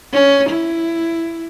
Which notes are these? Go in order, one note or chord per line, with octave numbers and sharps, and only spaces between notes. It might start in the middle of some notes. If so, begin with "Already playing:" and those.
C#4
E4